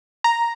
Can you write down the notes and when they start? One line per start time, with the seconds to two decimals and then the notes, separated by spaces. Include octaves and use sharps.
0.24 A#5